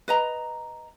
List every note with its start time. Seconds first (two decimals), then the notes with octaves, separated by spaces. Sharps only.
0.08 B4 D#5 A#5